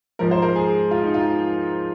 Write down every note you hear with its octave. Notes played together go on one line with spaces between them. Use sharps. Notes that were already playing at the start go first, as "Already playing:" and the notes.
G#2 F3 G#3 A#4
C5
A#4
G#4
F4
D#4
F4